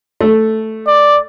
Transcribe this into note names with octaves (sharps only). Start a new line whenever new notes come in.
A3
D5